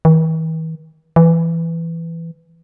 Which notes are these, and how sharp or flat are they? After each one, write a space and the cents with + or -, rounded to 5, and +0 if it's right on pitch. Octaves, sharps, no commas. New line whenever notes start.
E3 -45
E3 +10